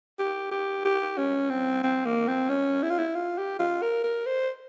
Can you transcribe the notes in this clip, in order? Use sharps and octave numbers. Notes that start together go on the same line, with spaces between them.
G4
G4
G4
C#4
C4
C4
A#3
C4
C#4
E4
F4
E4
F4
G4
F4
A#4
A#4
C5